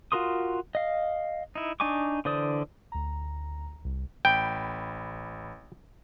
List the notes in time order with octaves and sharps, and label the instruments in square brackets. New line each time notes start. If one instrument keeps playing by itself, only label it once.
[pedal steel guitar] F4 F#4 A#4 C6 D#6
D#5 F5
D#4 E4
D4 D#4 G#5 C#6 D6
D3 E3 C5 D5 D#6
[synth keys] D2 A#5
C2
[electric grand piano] A1 B5 [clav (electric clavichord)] G5